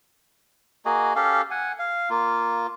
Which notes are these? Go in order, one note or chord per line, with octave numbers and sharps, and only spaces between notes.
A#3 F#4 G#4 D#5
C#4 G4 A4 F5
F#5 G#5
F5
A#3 F4